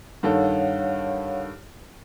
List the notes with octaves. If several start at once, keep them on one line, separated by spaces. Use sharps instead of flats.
G2 D#3 A4 C#5 F5 F#5